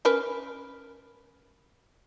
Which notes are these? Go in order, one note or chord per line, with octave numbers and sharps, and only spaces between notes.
C#4 A#4 B4